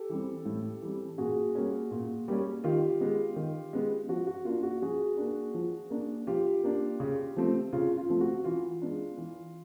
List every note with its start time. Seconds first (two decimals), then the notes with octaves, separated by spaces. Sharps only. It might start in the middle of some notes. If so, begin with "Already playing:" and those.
Already playing: G4 A4
0.09 E3 G3 C4
0.45 A2
0.82 E3 G3 C4
1.18 A#2 F#4 G#4
1.55 G3 A#3 C#4
1.91 A#2
2.28 G3 A#3 C#4
2.64 D#3 F4 G4
3.01 G#3 B3
3.36 D#3
3.73 G#3 B3
4.08 F3 F#4
4.27 F#4
4.45 A#3 D4 F4
4.63 F#4
4.82 F3 F#4 G#4
5.17 A#3 D4
5.54 F3
5.90 A#3 D4
6.27 F3 F4 G4
6.64 A#3 D4
7.00 C#3
7.36 F3 A3 C4
7.73 C#3 F4
7.97 F4
8.09 F3 A3 C4
8.21 F#4
8.44 E3 F4
8.82 G#3 B3 D4
9.18 E3